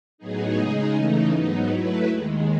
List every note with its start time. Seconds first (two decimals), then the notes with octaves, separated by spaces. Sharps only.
0.18 A2 F#3 B3 D#4 G#4
0.56 C#3 G#3 D#4 G#4
0.93 C#3 E3 A3 D#4
1.30 G#2 F#3 B3 D#4
1.68 F#3 A3 E4 B4
2.06 D#2 D#3 G#3